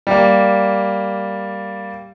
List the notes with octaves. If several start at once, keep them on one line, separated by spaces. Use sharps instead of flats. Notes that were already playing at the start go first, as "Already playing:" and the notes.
G3 A#3